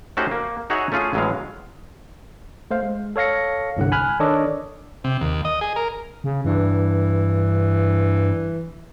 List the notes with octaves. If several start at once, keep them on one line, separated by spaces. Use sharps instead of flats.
A3 C#4 D#4 F#4 G4 C5
A#3
D#4 F#4 G#4 C#5 E5 F#5
A3 C#4 F4 G#4
A1 A2 F#3 G#3 B3 F5
A3 C5 F5
G#3
A4 C#5 F5 A#6 C#7
G1 C2 D3 F#5
G#5 B5 F6 F#6
D#3 D4 A4 C#5 D#5 D6
C3
D#2
D#5
G#4
A#4
C#3
G2 E3